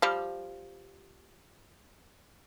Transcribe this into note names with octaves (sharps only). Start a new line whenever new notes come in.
F3 G3